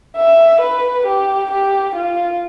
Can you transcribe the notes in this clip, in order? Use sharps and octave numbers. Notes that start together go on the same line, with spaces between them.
E5
B4
G4
G4
F4